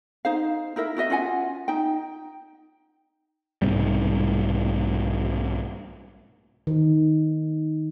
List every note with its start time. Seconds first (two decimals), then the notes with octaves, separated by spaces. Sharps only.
0.25 D#4 C5 F5
0.76 D#4 E4 A#4 E5
0.96 E4 F#4 D#5 E5
1.10 C#4 F4 F#5 G#5
1.68 D#4 G5
3.62 B1 G#2 C3 G3
6.67 D#3